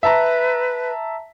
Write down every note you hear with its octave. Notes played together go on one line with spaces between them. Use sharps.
B4 E5 A5 A#5